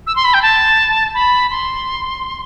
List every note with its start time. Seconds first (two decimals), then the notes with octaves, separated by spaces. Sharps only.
0.07 E6
0.16 C6
0.25 B5
0.34 G5
0.42 A5
1.14 B5
1.51 C6